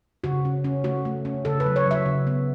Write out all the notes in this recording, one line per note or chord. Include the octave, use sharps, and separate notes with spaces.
C#3 F#4
C#4
C#4
A3 F#4
A3
C#4
C#3 A4
B4
F#3
C#5
F#3 E5
C#3
B3